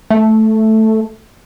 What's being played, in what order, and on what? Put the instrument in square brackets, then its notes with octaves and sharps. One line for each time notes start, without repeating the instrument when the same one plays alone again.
[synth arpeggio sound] A3